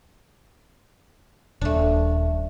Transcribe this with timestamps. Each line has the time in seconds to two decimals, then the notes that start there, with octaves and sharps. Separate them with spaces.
1.61 D#1 A3 D4